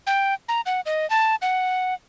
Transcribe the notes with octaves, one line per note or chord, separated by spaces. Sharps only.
G5
A#5
F#5
D#5
A5
F#5